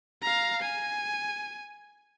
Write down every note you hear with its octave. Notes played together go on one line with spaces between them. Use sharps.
F5 A#5
G#5